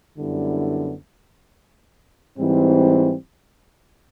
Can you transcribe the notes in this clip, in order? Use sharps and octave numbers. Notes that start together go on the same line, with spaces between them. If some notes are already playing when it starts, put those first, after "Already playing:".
F#2 D3 G3 B3 E4
G#2 E3 G3 C4